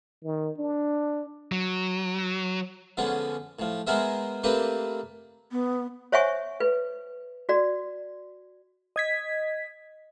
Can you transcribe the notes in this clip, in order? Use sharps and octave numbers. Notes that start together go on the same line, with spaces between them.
D#3
D4
F#3
D3 F3 G#3 B3 C#4
A2 F3
G#3 B3 G#4 A#4 C5 E5
A3 A#3 C4 D4 G4 B4
B3
C5 C#5 E5 F#5 G#5 C#6
B4
F#4 D5
D#5 G#6 B6